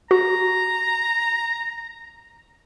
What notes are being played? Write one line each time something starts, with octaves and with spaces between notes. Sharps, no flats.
F#4 A#5